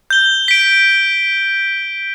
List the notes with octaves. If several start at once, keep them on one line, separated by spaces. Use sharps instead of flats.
G6 G7
B6 D7